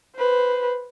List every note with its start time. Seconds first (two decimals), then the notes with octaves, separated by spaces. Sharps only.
0.16 B4 C5